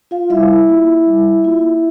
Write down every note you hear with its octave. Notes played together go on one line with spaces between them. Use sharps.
F4 F5
G3 E4 E5
A#3 F4
G3
A#3 F4